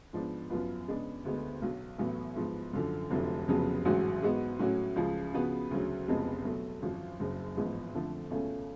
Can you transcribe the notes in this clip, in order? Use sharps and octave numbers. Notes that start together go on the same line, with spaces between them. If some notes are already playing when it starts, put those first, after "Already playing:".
G#2 F3 B3 D4
F#2 F3 B3 F4 B4
C#3 G#3 B3 D4
D2 D3 G#3 B3
B1 B2 F#3
A1 A2 F#3 B3
G#2 F3 B3
F#2 D3 F3
F1 F2 D3 F#3 A3
F1 F2 C#3 F#3 B3
A1 G#2 F#3 C#4 F#4
G#2 G#3 B3 F#4
A2 F#3 C#4 F#4
C#2 C#3 F3
C#3 F3 B3 F#4 B4
D2 C#3 F#3
F1 F2 C#3 G#3 B3
B2 F#3 A3
G#1 F#2 F3
F#1 F#2 C#3
A1 G#2 F3 G#3 B3
F2 D3 F3 A3
C#2 B2 A3 C#4